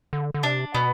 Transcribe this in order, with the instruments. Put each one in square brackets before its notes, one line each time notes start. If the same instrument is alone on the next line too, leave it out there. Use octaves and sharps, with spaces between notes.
[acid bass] D3
D3
[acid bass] C3 [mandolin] D4
[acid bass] B2 [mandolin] B3